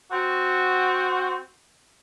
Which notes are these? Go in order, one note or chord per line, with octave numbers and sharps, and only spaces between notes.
C4 F#4